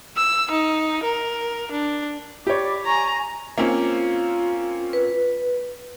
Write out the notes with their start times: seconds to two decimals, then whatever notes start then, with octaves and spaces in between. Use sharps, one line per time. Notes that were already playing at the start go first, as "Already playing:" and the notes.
0.17 E6
0.51 D#4
1.04 A#4
1.72 D4
2.47 G4 C#5 D5 B5 D6
2.86 G#5 A#5 C#6
3.58 A#3 C4 C#4 F4
4.93 B4